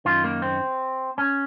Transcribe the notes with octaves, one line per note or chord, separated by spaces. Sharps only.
F#2 D#3 F4
A#3
C4
C#4